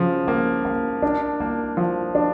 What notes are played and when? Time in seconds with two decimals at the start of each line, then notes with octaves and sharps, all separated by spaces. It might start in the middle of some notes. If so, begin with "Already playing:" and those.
Already playing: C#3 F3
0.28 A#3
0.65 A#3
1.02 D4
1.40 A#3
1.77 F3
2.15 D4